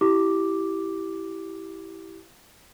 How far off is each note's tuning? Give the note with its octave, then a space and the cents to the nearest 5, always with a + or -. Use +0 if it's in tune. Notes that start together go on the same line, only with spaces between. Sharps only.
E4 +0 G4 -15 D6 +0